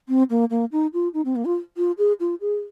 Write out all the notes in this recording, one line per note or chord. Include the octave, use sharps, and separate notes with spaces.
C4
A#3
A#3
D#4
F4
D#4
C4
A#3
F4
F4
G#4
F4
G#4